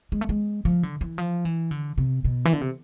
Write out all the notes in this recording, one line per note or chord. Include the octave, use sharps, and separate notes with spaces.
G#3
A3
G#3
F3
D3
E3
F3
E3
D3
C3
B2
E3
D3
C3